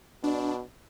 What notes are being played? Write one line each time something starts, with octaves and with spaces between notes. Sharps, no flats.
B2 D4